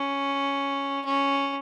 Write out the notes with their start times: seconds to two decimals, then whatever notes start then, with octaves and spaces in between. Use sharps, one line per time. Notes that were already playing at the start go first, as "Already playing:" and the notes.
Already playing: C#4
1.05 C#4